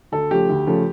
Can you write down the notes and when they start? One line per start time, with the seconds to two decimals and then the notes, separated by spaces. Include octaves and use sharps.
0.12 D2 A4
0.31 C#3 F3 A3 G4
0.49 D2
0.67 C#3 F3 A3